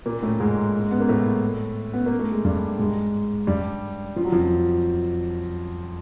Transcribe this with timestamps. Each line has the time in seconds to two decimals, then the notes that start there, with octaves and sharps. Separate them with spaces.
0.06 A#2 A#3
0.22 A2 A3
0.40 G#2 G#3
0.91 B3
1.00 A#3
1.09 A2 A3
1.94 B3
2.06 A#3
2.19 A3
2.32 G#3
2.45 G2 G3
2.79 G#2 G#3
3.47 G2 G3
4.16 F3
4.25 F#3
4.32 F2 F3